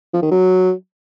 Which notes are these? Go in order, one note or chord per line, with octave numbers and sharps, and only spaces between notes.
F3
D#3
F#3